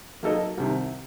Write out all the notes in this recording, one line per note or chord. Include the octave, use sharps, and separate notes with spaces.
F#3 A#3 D#4 A4 D#5
C2 C3 D#3